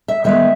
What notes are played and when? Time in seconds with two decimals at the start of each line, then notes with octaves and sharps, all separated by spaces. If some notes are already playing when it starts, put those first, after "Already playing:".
0.08 E5
0.24 D#3 G#3 B3 E5